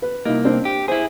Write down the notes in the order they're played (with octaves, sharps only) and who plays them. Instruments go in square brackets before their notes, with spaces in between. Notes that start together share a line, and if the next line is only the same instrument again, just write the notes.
[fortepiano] B4
[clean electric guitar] C2 A#3 [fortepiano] D#4 E4
[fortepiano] C4 D4 D#4
[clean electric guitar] G4
[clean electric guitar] E4 G#4 [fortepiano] C5